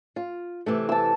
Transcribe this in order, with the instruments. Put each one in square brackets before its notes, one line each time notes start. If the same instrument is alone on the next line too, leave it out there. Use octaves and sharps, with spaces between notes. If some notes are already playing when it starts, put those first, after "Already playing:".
[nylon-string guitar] F4
C3 E3 A3
[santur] A5 E6